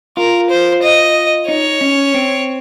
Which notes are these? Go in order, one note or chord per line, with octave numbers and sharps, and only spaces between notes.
F4 A#4
C5
D#5
D#4 C#5
C#4
C4